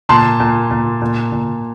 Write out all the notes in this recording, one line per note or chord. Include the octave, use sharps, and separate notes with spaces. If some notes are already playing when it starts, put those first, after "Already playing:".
A#2 A5 C6
A#2
A#2
A#2
A#2